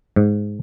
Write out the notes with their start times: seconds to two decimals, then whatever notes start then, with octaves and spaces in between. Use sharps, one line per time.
0.16 G#2